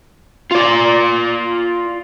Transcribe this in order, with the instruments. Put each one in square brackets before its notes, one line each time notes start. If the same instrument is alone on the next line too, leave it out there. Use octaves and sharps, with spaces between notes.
[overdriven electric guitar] F4 D5